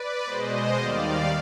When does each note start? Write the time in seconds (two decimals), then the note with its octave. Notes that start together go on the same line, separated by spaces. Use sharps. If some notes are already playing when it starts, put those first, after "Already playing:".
Already playing: B4 D5
0.24 B2 G#3 C5 D#5
0.76 D#2 D#3 G3 D5 F5